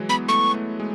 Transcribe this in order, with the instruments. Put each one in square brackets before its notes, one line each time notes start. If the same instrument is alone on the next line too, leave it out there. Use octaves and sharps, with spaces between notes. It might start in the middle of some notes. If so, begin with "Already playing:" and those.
Already playing: [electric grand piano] E3 F#3 G#3
[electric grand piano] B3 [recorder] B5
[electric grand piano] A3 [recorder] C#6
[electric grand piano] A3
G#3